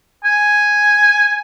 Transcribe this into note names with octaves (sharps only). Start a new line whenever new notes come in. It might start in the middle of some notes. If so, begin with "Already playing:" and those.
G#5